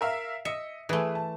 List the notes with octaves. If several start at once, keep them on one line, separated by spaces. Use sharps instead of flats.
A#4 E5 F5
D#5 E5 C#7
E3 A3 G#4 B4
A5